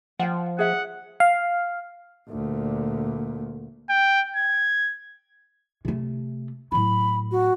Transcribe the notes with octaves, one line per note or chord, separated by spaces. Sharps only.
F3 F#5 G5
G#4 E5 F#5
F5
D2 A#2
G5
G#6
C3 A3
A2 F#3 B5
F#4